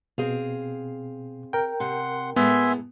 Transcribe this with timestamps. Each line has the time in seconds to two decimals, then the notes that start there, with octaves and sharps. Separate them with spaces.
0.18 B2 C4 G#4 F5
1.53 A#4 G5
1.80 C3 F#5 C6
2.36 A2 G#3 A3 B3 E5 G#5 C6